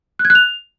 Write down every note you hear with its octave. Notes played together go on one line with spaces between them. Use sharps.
F#6
G#6
F#6
F7